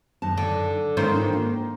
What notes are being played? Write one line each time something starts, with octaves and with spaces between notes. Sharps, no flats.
F#2 D#3 A5
D3
G#2 D#3 C#4 C5
E3 D4 F4
A#3